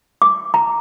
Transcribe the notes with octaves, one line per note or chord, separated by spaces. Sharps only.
D6
A#5